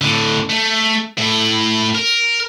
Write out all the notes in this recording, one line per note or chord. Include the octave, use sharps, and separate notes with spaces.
A2 D3
A3
A2 E4
A#4